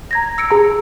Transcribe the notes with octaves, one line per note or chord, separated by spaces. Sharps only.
A#5 G#6 A#6
E6 C#7 D7
G#4 A#5